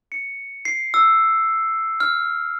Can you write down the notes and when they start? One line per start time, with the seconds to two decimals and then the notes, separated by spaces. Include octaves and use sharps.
0.12 C#7
0.65 C7
0.94 E6
2.00 F6